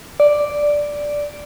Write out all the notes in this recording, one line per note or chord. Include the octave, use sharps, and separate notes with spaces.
D5